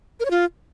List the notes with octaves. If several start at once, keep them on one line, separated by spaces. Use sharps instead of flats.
A#4
C#5
F4